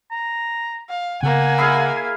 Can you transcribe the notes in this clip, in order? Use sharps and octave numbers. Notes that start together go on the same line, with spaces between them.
A#5
F5
C#3 A#3 B3 F#5 G#5
E4 G#4 F5